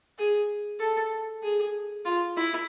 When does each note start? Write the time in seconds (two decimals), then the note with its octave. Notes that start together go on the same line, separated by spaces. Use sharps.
0.18 G#4
0.80 A4
1.43 G#4
2.05 F4
2.37 E4